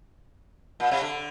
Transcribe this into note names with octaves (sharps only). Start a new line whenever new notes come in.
A#2
C3
D3